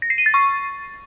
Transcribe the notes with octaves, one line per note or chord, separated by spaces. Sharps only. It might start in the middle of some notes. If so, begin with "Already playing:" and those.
A#6
C7
D#7
A6
C#6